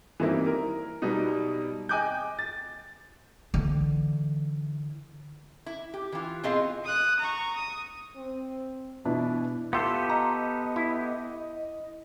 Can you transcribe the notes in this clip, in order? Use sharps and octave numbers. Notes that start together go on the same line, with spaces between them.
E3 G3 A#3 C4 D#4 E4
A#4
B2 F#3 G3 B3 D#4
D#5 G5 G#5 D6 F#6 G6
A6
D3 E3
E4
G4
E3 F4
B2 C4 F4 G#4 D#5 F5
D#6 F#6
A#5 C#6
D#6
C4
B2 E3 D4 E4
B3 F4 G4 A4 E5 C6
D#5 A#5
E4